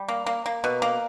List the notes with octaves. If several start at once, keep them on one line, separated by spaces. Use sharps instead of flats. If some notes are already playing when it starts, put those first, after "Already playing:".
Already playing: G3
A#3
A#3
A#3
B2
A#3